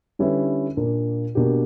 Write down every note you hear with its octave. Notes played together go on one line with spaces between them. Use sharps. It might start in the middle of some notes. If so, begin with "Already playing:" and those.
D3 G3 C#4 E4 B4
A#2 A#3 D4
B2 A#3 D4 G4